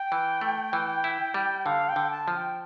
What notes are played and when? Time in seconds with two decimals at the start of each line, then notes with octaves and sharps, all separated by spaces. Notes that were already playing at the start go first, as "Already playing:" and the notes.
Already playing: G5
0.12 E3
0.41 A3
0.73 E3
1.04 E4
1.34 G3
1.66 D3 F5
1.89 G5
1.96 D3
2.11 A5
2.28 F3
2.35 G5